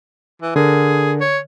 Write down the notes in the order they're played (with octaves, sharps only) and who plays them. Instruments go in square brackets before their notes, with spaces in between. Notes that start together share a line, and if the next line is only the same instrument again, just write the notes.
[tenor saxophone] E3
[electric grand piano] D3 A#4 [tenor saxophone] G#4
[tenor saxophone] C#5